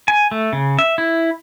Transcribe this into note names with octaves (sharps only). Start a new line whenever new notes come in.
G#5
A3
C#3
E5
E4